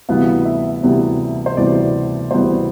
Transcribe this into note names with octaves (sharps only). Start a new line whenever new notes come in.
D2 C3 E3 G3 B3 F5
E5
D2 C3 E3 G3 B3
C5
D2 C3 E3 G3 B3 D5
D2 C3 E3 G3 B3 C5